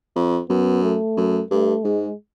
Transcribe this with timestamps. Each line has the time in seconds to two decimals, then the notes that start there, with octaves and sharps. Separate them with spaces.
0.16 F2
0.49 F#2 B3
0.83 A3
1.17 F#2
1.51 G2 A3
1.84 G#2 G#3